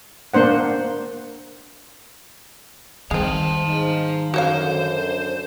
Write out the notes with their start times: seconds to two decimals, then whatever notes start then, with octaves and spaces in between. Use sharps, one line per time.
0.34 A#3 D4 C5 F#5
3.11 D#3 G3 G#3 C4 F5 A5
3.67 G#2 D#4
4.34 F#2 D3 F#4 C5 C#5 F5